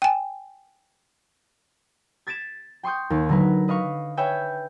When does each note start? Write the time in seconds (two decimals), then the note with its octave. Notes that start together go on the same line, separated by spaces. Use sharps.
0.02 G5 G#5
2.27 G#6 A6 B6 D7 E7
2.83 G5 C6 C#6 D#6 G6
3.10 D#2
3.29 D3 F#3 A#4 B4
3.68 B4 D#5 F5 C#6
4.17 B4 C#5 E5 G5 G#5